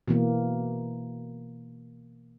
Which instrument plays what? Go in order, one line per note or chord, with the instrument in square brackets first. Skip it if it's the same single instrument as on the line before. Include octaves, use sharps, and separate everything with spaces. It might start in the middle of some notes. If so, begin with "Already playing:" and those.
[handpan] B2 E3 A#3